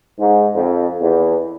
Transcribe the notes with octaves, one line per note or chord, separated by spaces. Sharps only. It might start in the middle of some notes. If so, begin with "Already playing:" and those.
G#2
F2
E2